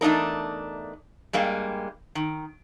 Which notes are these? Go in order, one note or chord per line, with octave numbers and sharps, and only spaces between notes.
E2 A3 D4 D#4 A#4
G2 G3 G#3 A#3
D#3